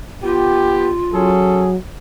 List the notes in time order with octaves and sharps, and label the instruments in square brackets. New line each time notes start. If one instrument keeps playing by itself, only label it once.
[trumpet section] B3 G4 [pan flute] F4
[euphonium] F#3 [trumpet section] C#4 G#4 A4